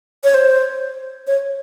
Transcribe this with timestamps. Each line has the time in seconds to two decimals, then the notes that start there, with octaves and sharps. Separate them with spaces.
0.24 C#5
0.34 C5
1.27 C#5